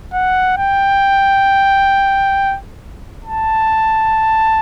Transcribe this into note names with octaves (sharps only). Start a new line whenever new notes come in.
F#5
G5
A5